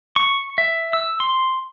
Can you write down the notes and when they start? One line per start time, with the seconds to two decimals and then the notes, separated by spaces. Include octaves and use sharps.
0.16 C#6
0.58 E5
0.93 E6
1.20 C6